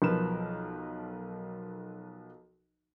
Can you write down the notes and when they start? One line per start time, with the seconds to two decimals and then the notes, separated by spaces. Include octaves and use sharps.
0.02 B1 F3 A#4 B4 E7